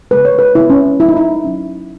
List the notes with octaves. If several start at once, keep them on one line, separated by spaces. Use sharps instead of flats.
C#3 G#3 B3 B4
C#5
B4
C#3 G#3 B3 E4
C#4
F#3 C#4 E4
D#4
E4
F#3 C#4